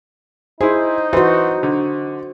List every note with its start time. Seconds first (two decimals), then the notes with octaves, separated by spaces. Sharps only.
0.61 D#4 E4 G#4 C5
1.13 E3 F#4 C5
1.63 D3